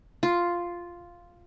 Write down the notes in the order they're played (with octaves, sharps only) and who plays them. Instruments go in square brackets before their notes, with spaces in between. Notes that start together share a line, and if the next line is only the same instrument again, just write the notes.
[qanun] F4